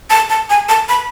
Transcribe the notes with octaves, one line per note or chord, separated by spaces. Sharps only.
A5
A5
G#5
A5
B5